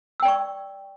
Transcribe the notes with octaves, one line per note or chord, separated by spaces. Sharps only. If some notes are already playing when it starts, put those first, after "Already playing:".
D5 G5 C#6 E6